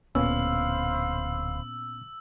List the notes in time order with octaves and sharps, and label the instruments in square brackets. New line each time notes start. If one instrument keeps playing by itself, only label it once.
[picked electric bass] D1 [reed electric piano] A#2 B3 C#4 [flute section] C5 F5 B5 [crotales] E6